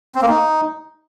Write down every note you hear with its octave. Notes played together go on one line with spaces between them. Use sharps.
C4
A#3
D#4